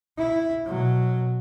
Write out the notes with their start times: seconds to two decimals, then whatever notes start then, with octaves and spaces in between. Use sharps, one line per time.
0.18 E4
0.66 B2 F#3